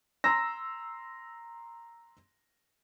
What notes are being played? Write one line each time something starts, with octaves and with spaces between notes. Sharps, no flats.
A#5 C6 E6 A#6